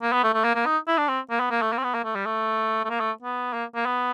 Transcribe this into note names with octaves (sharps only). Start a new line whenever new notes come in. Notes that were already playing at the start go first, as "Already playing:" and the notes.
A#3
B3
A3
A3
A#3
A#3
D#4
E4
D4
C4
A#3
B3
A#3
A3
A#3
C4
B3
A#3
A3
G3
A3
A3
A#3
A3
B3
A#3
A#3
B3